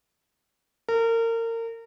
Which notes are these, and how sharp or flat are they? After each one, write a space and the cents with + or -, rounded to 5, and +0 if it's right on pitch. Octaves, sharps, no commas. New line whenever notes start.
A#4 -30